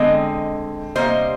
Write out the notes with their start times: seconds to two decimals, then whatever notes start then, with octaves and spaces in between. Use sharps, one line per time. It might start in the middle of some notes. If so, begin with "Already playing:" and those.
Already playing: D3 G#3 C4 D#5
0.95 C3 G3 A#3 C5 D#5